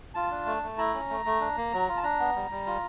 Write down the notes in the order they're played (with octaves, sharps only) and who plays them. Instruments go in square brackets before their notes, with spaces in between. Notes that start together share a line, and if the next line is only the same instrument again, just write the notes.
[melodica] F4 A5
D4
A3
A3
E4 A#5
C#4
A3
A3
D4
A#3
F#3
F4
A5
D4 A#5
B3
G3
G3
F4